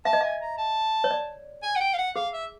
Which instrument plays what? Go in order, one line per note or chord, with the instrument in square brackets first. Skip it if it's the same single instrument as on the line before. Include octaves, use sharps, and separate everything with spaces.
[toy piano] E5 [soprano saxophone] A5
[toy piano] D#5
[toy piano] E5 [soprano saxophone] G#5
[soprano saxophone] A#5
A5
[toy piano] C#5
D5
[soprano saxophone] G#5
F#5
G5
F5
F#5
[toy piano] G#4 [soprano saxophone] F5
[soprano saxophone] E5